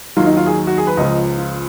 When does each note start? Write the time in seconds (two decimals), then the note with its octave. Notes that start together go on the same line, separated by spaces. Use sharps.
0.17 D#2 D#3 F#3 F4
0.26 D#4
0.37 F4
0.46 G#4
0.67 F#4
0.77 G#4
0.87 B4
0.97 C#2 C#3 F3 D#5
1.38 F4